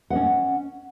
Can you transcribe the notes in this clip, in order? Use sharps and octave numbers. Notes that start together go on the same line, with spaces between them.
C#4 D#5 F#5